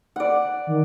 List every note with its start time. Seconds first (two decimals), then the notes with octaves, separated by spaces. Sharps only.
0.16 D5 F#5
0.67 D#3